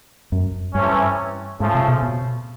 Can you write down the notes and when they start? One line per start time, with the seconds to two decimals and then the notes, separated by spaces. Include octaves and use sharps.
0.32 F#2
0.74 G2 C3 E3 A3 C#4
1.59 G#2 C#3 F3 A3
1.74 C3
1.88 B2
2.02 B2